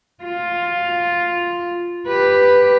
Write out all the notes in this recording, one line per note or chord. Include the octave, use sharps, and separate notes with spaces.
F4
G4 B4